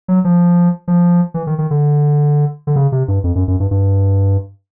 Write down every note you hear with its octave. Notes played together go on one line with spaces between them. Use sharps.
F#3
F3
F3
E3
D#3
D#3
D3
D3
C#3
C3
G2
F2
F#2
F#2
G2
G2